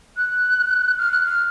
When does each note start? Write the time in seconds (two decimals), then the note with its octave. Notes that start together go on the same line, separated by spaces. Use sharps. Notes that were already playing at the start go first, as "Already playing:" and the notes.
0.17 F#6
0.98 F6
1.12 F#6
1.25 F6